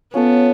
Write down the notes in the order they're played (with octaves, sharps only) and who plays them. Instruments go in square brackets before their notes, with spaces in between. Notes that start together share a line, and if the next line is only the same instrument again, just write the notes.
[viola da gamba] B3 [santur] C#4 F4 A4